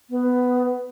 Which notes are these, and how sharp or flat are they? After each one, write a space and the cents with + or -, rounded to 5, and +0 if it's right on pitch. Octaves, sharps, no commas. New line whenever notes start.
B3 +10